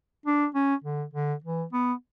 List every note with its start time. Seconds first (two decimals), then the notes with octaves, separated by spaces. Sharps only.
0.26 D4
0.54 C#4
0.84 D3
1.13 D3
1.44 E3
1.73 B3